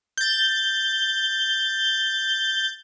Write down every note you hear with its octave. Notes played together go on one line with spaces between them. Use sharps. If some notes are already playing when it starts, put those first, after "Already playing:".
G6 A6